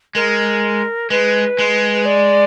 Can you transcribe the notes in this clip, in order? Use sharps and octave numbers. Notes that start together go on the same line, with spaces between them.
G#3 A#4
G#3 B4
G#3
D5